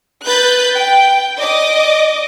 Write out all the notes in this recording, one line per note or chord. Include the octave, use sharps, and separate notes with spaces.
B4 F#6 G6 A6
G5
D5 D#5 D6